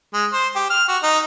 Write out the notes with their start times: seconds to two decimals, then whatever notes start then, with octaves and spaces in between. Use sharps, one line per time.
0.13 G#3
0.33 C5
0.56 G4
0.70 F6
0.88 F#4
1.03 D#4